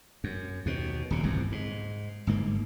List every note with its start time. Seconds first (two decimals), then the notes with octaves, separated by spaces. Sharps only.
0.24 F#2
0.66 D#2 B2
1.11 D#1 A#2
1.23 G1 C2 F2
1.52 G#2
2.27 G1 G#2 A#3